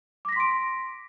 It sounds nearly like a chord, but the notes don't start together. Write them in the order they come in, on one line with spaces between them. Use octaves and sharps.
D6 A#6 B6 C6 D7